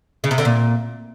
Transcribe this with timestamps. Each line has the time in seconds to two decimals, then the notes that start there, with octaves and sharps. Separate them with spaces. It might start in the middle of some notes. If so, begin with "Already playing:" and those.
0.24 C#3
0.31 C3
0.38 D3
0.45 A#2